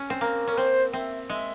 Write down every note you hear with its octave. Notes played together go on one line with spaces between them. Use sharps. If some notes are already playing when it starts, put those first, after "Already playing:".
Already playing: C#4
C4
A#3
C#4 A#4
C4 C5
C4 E5
G#3 E5